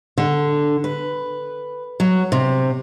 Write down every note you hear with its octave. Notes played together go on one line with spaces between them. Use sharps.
D3
B4
F#3
C3